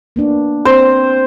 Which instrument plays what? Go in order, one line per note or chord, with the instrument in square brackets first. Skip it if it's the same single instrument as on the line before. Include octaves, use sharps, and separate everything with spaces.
[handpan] A#3 B3 D4
[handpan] C4 [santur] C5